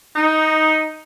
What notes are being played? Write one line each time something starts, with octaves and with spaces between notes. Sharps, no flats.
D#4